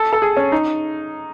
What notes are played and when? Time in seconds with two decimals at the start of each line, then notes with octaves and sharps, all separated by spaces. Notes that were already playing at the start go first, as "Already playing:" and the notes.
Already playing: A4
0.13 A4
0.22 G#4
0.37 C#4
0.52 D#4